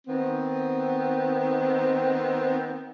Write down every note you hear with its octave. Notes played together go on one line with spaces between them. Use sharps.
D#3 B3 C4